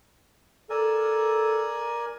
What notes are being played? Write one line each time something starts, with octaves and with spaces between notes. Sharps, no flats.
A4 A#4 D5 G#5